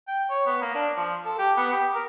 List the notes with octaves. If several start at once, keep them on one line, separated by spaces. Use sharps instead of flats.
G5
C#5
B3
A#3
D4
F3
A4
G4
B3
G4
A#4